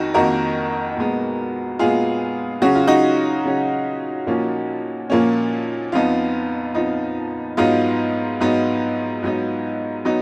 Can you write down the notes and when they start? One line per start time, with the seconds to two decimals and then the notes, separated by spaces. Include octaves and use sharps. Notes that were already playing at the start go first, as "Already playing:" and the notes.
Already playing: F2 D#3 D#4 F#4
0.14 F2 D#3 A#3 F#4 A#4
0.97 A#2 G#3 B3
1.79 A#2 G#3 B3 F4 G#4
2.62 C#3 F#3 C#4 F#4
2.75 F4
2.87 D#4 F#4
3.45 C#3 F#3 C#4
4.27 A#2 F3 A#3 C#4
5.10 A#2 F3 A#3 C#4
5.92 F2 F3 B3 D#4 F4
6.75 F2 F3 B3 D#4
7.57 G#2 F#3 B3 D#4 F4
8.40 G#2 F#3 B3 D#4
9.23 G#2 F#3 B3 D#4
10.05 F#3 B3 D#4